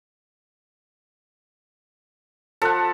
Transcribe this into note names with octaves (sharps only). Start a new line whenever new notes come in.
F3 A4 F#5